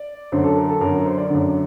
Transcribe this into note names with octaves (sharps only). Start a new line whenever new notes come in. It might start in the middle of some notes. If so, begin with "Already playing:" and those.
Already playing: D5
F#2 D3 C5
A4
A#4
A4
F#2 D3 A#4
A#4
C5
D5
F#2 D3